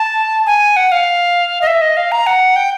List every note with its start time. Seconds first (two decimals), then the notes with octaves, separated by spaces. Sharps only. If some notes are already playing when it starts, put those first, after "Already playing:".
Already playing: A5
0.46 G#5
0.76 F#5
0.92 F5
1.62 D#5
1.67 E5
1.81 D#5
1.97 F5
2.12 A#5
2.27 F#5
2.56 G5